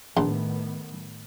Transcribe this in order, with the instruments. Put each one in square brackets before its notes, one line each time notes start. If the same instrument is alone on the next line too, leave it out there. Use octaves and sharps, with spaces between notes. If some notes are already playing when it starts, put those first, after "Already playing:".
[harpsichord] A#1 C6 [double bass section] A2 D#3 B3